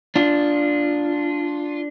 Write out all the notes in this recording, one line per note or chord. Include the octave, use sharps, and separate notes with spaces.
D4 F4